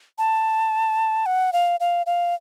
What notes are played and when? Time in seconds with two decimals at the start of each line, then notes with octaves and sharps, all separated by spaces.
0.18 A5
1.26 F#5
1.53 F5
1.80 F5
2.06 F5